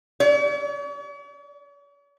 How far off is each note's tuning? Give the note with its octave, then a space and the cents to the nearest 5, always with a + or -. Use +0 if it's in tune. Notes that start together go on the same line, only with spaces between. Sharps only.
C#5 +45